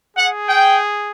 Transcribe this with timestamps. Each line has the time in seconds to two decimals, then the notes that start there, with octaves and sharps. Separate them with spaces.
0.17 G#4 F#5
0.49 G5